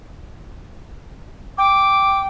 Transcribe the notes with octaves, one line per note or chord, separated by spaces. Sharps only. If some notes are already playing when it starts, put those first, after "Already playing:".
G5 D6